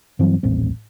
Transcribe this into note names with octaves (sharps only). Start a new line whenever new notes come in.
G2 E3 F#3 C4
D#1 A1 C4